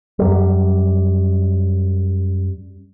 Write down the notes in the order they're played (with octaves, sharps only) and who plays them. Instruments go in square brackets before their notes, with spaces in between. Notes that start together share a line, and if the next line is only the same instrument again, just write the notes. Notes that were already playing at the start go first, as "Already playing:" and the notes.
[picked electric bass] F#2 G3